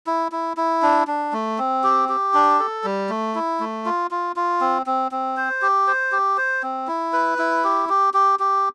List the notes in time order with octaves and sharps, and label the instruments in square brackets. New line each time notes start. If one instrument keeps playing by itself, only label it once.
[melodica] E4
E4
E4
D4
D4
A3
C4
G4
G4
D4
A4
G3
A3
E4
A3
F4
F4
F4
C4
C4
C4
C5
G4
C5
G4
C5
C4
E4
B4
E4
G4
G4
G4
G4